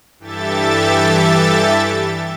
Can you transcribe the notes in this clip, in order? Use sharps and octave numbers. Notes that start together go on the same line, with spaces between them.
G2 E3 G4 A4 E5 A6